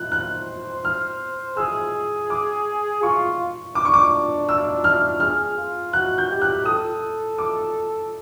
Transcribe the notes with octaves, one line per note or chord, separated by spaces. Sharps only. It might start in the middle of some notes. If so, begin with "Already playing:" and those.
Already playing: F#6
C5 F#6
F6
G#4 E6
D6
F4 C#6
D4 D6
C#6
D6
E6
F6
G#4 F6
F4
F#4 F#6
G6
G4
F#6
A4 D#6
D6